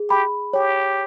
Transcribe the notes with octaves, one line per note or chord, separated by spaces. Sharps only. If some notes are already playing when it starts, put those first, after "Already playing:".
Already playing: G#4
G4 B5
G4 C#5